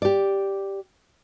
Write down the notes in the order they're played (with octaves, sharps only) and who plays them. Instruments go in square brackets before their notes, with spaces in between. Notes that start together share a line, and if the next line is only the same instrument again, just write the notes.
[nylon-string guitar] G4 D5